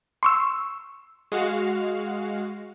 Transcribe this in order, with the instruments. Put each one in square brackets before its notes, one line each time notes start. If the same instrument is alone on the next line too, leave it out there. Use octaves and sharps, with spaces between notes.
[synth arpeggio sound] C6 C#6 E6
[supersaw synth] G#3 F#4 F5